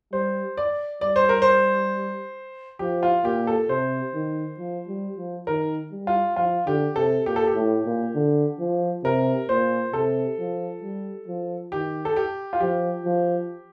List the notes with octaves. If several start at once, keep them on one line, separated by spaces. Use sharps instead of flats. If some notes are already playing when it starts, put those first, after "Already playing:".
G3 C5
D5
G3 D5
C5
A#4
C5
F3 G4
F4
A#2 G4
A4
C3 C5
D#3
F3
G3
F3
D#3 A#4
G3
F4
F3 F4
D3 G4
C3 A4
A#2 G4
A4
G4
A2
A#2
D3
F3
C3 A#4
A#2 C5
C3 A4
F3
G3
F3
D#3 G4
A4
G4
F4
F3 G4
F3